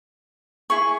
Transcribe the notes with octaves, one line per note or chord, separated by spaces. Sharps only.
E4 G#4 C#6